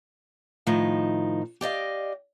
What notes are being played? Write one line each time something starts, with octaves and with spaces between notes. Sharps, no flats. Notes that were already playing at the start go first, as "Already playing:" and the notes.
A2 D#3 F3 D#4
G4 D5 D#5 F5